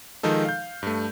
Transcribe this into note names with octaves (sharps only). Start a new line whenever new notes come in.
D#3 F3 G#3 D#4 A4
F5 G6
G2 A3